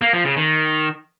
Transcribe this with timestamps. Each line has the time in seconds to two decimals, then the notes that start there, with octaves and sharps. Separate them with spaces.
0.02 A#3
0.13 F3
0.25 C#3
0.37 D#3